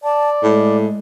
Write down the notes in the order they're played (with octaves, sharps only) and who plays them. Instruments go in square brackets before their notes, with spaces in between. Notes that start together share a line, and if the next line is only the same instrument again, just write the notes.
[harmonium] D5 [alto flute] A5
[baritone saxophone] A2 [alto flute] G#3